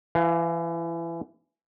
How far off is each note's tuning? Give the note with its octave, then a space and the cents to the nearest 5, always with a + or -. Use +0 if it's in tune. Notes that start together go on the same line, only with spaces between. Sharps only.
E3 +25 F5 +0